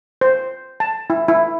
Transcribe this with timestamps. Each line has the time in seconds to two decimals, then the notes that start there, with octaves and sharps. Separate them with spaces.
0.21 C5
0.80 A5
1.10 E4
1.28 E4